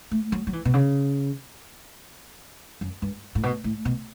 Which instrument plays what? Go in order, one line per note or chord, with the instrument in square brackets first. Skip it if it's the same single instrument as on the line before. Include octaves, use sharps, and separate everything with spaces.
[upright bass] A3
F#3
F#3
E3
B2
C#3
F#2
G2
A2
B2
A2
B2